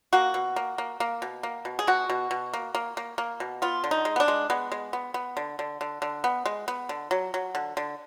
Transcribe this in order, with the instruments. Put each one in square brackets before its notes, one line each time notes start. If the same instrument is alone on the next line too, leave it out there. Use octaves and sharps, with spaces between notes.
[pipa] A#3 F#4
B2
A#3
A#3
A#3
B2
A#3
B2
G#4
B2 F#4
B2
B2
A#3
A#3
A#3
A#3
B2
B3 F4
D3
D#4
G#3
B3
D4
G#3
G#3 B3
G#3
B3
B3
D3
D3
D3
D3
B3
G#3
B3
D3
F#3
F#3
D3
D3